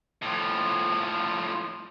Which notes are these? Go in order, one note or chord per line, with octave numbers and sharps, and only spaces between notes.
A2 F3